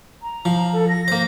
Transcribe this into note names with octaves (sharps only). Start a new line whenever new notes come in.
A#5
F3
A4
A#6
A#3 C5